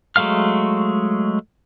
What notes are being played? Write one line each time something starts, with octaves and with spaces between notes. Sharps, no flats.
F#3 G#3 A3 F5 F6